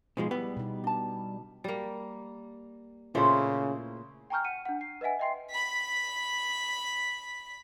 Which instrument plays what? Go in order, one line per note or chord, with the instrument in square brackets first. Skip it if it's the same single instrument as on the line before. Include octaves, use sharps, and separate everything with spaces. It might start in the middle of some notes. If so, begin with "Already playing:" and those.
[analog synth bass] G#2 [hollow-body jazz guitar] B2 F3 G#3
[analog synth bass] G3 [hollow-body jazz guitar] B3 [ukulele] E4 G#4
[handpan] B2 D#4
[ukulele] D4 A5
[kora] G3 A#3
[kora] A#2 A3 [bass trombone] C#3 [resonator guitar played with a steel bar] C4 E4 C5
[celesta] G5 G#5 A#5 C#6 F6 G6
F#5 C#7 D#7
D4 F#5
C7
B4 D#5 E5 F#5 G#5
D#5 E5 G5 C6 C7
[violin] B5 B6